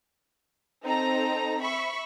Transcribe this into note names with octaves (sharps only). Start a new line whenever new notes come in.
C4 D#4 A4 A#5
E5 B5 C#6